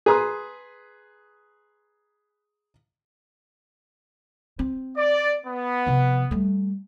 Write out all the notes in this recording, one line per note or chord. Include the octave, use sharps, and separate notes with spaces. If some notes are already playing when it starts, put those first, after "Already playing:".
G#4 B4 A#5 C6 D#6
C4
D5
B3
C3 F3
G3 A3